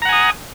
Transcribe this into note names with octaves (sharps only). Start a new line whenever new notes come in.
F#5 G#5 A#5 D#6